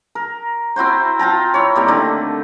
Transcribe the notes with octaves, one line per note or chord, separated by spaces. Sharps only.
A#4
C4 E4 F#4 C5
F4 G5 A5 A#5
E4 C#5
G3 A#3 C4
D3 D#3 A3